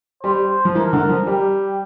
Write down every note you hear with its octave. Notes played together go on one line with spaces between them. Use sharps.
G3 C5
F3
E3 A#4
D3
F3
G3 G4